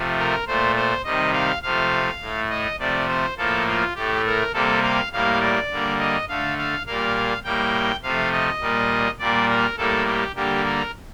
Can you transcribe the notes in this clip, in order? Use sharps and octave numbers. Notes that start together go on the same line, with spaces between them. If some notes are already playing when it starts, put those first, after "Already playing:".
Already playing: C3 F3 A3
A#4
A#2 A3 C5
C5
C3 D#3 G3 D#5
F5
C3 F3 A3 F5
A2 A3
D#5
C3 F3 A3 D5
C5
A2 F3 A#3 A4
F4
A2 A3 G4
A#4
C3 G3 A#3 A4
F5
A2 G3 A#3 F5
D5
D3 G3 A#3
D#5
D3 A3 F5
F5
A#2 G3 A#3 F5
A2 G3 A#3 G5
C3 F3 A3 F5
D#5
A#2 G3 A#3
A#2 G3 A#3 D5
A#4
A2 G3 A#3 A4
G4
D3 G3 A#3 G4
A#4